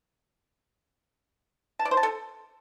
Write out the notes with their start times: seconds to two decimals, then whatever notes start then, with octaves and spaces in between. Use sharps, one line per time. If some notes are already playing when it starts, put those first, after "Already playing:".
1.79 A5
1.85 D5
1.91 C5
1.97 A5
2.03 A4